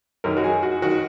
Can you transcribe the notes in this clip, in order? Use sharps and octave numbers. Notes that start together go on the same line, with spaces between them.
F#2 D#3 A#4
F#4
G#4
F#4
D#3 F#4